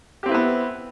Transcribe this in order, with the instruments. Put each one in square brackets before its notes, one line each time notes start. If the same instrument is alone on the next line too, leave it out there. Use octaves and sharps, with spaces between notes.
[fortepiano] G4
C4
E4
B4
B3